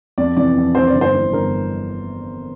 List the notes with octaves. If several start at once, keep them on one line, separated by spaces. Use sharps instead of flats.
F2 D5
C3 E3 D5
F2
C3 E3 C5
D5
G1
C5
G2 E3
G1 A#4